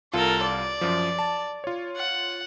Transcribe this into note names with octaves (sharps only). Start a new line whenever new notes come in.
C2 F4 A4 A#4
D5
F#2 F3
A5
F4 C#5
F#5